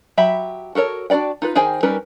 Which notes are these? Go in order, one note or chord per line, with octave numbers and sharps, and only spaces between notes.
F#3 G4 E5 B5
F#4 A4 A#4 C#5
D4 F#4 A4 D5 G5
D#4 F4 B4
D#3 G#4 C5 G5 G#5
G3 C#4 D#4 A#4 B4